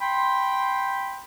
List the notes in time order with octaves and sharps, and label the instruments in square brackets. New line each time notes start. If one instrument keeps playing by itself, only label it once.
[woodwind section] G5 B5 C6